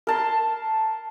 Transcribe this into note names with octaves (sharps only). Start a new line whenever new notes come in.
A#4 A5 C6